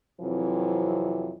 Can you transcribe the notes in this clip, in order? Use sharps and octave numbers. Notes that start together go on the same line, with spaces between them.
F2 C3 E3 F#3